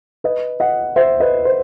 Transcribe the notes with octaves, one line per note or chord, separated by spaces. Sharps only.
B4 D#5
D#5 F#5
C5 E5
B4 D#5
C5